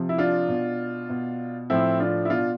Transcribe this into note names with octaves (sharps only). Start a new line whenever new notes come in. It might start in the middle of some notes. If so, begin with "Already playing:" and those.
Already playing: C3 F3
E4
D4 F4
B2
B2
A2 F3 C4 E4
D4 F4
E4
B2 D4 F4